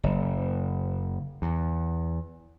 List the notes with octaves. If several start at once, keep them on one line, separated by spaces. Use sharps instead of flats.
F#1
E2